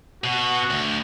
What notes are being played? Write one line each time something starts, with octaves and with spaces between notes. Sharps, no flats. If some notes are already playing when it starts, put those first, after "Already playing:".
B2 F#4
D2